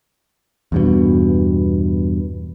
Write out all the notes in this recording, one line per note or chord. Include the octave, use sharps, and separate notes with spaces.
E2 G2 B2